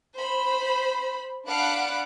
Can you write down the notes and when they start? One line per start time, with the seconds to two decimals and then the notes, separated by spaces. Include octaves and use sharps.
0.17 C5 B5
1.47 D4 F5 F#5 B5 F#6 D7